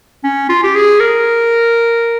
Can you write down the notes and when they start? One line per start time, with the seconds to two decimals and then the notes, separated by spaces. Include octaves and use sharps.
0.24 C#4
0.49 F4
0.63 G4
0.75 G#4
1.00 A#4